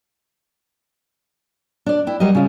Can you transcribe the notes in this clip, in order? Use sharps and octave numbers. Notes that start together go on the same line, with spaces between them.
D4 D5
E4 G5
F#3 G3 A#4 D#5
C#3 F4